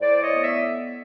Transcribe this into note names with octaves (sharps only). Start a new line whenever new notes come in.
A2 C5 D5
C#5 D#5
B3
D5 E5